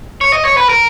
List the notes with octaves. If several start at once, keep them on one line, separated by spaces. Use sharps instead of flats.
C#5
D#5
C#5
B4
A#4